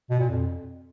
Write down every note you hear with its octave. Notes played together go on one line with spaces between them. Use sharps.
B2
A#2
F2